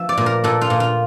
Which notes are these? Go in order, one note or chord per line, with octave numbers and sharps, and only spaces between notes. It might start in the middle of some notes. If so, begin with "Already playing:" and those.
Already playing: F3 E5
D5
A#2
A#4
A#2 A4
F4
A#2
F4